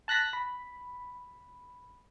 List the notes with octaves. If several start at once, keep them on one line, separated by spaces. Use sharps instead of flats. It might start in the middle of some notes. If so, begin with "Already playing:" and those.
A5 F#6 A#6 B6
B5